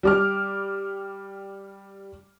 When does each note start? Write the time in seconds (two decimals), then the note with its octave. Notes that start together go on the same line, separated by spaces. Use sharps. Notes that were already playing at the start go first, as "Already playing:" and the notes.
0.03 G3 D6 F6